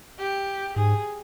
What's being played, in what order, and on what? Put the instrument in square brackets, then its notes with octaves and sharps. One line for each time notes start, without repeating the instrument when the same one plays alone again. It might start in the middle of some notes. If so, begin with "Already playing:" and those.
[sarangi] G4
[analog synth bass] G#2 [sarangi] G#4